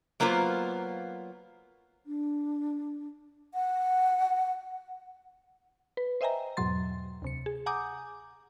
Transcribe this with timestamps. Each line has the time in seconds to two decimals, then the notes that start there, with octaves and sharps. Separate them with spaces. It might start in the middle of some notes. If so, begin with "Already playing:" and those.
0.20 F#3 A#3 B3 F4 C5
2.06 D4
3.54 F#5
5.97 B4
6.21 C5 D#5 E5 G5 G#5 A#5
6.57 E2 G#2 B2 F#3 C6 A6
7.22 D2 C3 C#7
7.46 G#4
7.66 F#5 G#5 A#5 D6 D#6 G6